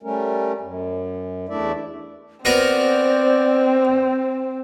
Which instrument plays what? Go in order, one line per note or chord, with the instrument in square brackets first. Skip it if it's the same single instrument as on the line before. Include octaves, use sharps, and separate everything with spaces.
[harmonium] G3 A3 C#4 A#4
F#2
E2 A3 D4 E4 D5 E5
[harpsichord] B3 F#4 A#4 [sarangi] C4 [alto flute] C5 [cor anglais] D5